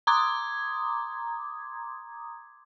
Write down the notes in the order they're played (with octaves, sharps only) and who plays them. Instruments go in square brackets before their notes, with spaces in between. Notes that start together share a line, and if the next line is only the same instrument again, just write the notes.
[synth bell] A#5 C6 D6 D#6 G#6